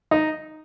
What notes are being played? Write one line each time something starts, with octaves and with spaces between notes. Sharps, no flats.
D#4